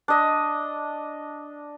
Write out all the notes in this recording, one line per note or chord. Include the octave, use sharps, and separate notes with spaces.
D4 D#5